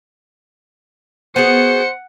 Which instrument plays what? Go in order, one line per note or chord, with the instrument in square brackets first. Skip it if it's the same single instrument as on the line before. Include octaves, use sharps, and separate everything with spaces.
[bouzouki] B3 F#4 G#4 [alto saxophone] C5 [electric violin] F#5 C#7